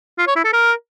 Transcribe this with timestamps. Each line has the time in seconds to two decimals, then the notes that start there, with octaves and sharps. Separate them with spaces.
0.18 F4
0.27 C#5
0.36 E4
0.44 A4
0.53 A#4